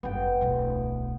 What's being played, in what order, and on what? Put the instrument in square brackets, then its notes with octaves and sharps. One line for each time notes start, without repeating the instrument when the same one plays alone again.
[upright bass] G1 F#2 [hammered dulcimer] B3 G5
[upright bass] D1 B1